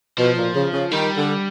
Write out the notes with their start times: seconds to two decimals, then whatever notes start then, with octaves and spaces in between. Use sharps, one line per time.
0.18 B2 F3
0.37 A#2
0.55 C#3
0.73 C#3
0.92 D#3 G3
1.16 D3